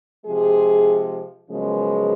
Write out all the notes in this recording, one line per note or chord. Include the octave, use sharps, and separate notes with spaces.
C3 F3 G#3 G#4
F#2 C#3 F3 G#3 B3